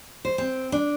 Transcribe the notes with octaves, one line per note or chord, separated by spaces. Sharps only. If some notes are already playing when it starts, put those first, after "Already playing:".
C5
C4
D4